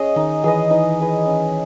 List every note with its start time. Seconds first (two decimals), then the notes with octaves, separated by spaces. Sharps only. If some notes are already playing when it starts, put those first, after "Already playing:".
Already playing: C#4 G#4 D#5
0.16 D#3 D#4
0.44 E3 G#4 B4 D#5
0.70 E3 D#4
0.99 G#4 B4 D#5
1.25 C#4